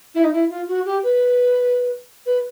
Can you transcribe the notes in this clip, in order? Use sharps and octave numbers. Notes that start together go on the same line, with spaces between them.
E4
D#4
E4
F4
F#4
G4
B4
B4